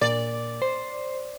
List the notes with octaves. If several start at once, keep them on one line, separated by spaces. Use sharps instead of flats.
A#2 D5
C5